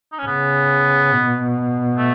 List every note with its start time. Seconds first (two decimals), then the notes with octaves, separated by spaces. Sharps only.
0.12 D#4
0.19 C#4
0.26 C#3 B3
1.12 B2
1.98 A3